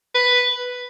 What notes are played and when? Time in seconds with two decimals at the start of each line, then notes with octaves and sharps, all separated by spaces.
0.15 B4